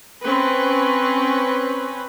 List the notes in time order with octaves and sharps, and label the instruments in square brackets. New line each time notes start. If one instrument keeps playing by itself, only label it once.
[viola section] C4 C#4 B4